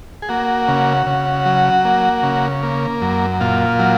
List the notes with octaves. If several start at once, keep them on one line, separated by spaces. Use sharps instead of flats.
G#4
A#3 F#4
C#3
C#3
F#3
A#3
C#3
A#3
F#2
A#2 F4
F#3